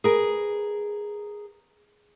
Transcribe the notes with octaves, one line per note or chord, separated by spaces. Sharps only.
G#4 A#4 B4